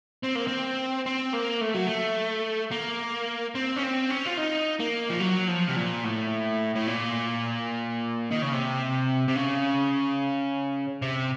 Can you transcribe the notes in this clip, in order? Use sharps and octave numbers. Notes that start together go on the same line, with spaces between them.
C4
A#3
C4
C4
A#3
A3
F#3
A3
A#3
C4
C#4
C4
C#4
F4
D#4
A#3
F3
F#3
F3
C3
A#2
A2
A2
A#2
D#3
C#3
C3
C3
C#3
C3